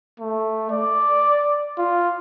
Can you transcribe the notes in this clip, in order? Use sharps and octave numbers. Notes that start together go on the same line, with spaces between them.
A3
D5
F4